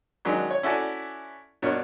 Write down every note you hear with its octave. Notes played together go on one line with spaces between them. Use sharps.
D#3 F#3 G#3 C#4 D4
C#5
C#4 E4 F#4 A4 D5 G#5
G2 B2 D4 A#4 C#5